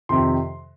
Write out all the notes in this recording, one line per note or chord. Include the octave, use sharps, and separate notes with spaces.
F2 C3 D#3 C6